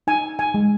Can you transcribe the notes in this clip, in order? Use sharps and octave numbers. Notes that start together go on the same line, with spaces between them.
D#4 G#5
G#5
G#3